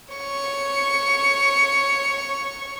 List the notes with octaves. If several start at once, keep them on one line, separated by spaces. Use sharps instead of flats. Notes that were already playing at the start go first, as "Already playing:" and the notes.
C#5 C#6